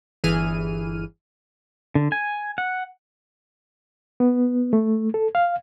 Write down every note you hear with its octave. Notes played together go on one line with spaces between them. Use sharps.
G1 E3 G#4 F6 D#7
D3
G#5
F#5
B3
A3
A4
F5